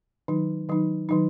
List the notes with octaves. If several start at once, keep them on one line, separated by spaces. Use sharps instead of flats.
D#3 F#3 D#4
D#3 F#3 D#4
D#3 F#3 D#4